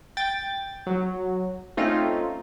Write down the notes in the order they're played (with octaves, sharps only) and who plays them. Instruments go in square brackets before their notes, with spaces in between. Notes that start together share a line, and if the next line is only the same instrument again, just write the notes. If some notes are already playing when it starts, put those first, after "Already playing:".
[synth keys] G5 A6
F#3
A3 C4 C#4 D#4 F4